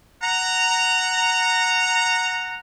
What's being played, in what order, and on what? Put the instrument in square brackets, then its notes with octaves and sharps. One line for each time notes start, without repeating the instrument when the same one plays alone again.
[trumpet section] F#5 A#5